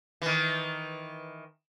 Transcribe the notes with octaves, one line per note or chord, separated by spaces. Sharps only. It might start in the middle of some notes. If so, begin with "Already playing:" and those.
D#3 E3